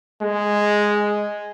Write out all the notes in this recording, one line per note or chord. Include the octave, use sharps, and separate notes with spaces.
G#3